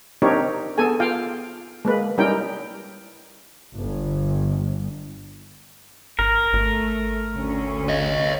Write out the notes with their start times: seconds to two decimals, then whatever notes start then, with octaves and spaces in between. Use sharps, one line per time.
0.22 C4 D4 D#4 G4 A#4 C#5
0.78 B3 G#4 A4 G#5
1.00 F4 F5 G5
1.85 G#3 A#3 B4
2.18 G3 C#4 D#4 E4 A#4 G5
3.76 G1
6.19 G#1 A#4
6.53 G#1 A3
7.35 D2 C#4
7.89 C#5 D#5